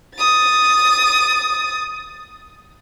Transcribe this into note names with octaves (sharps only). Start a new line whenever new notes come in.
D#6 A6